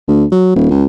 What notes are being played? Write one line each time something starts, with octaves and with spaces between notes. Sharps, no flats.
D2
F#3
D#1
C#2